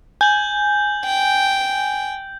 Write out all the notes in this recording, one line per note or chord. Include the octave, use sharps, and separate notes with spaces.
G#5 G6 F#7
G5